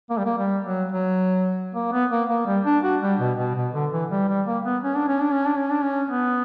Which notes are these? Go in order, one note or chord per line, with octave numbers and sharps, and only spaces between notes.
A#3
G3
A#3
G3
F#3
F#3
A#3
B3
A#3
A#3
G3
D4
F#4
G3
B2
B2
B2
D3
E3
G3
G3
A#3
B3
C#4
D4
C#4
D4
C#4
D4
C#4
D4
C#4
B3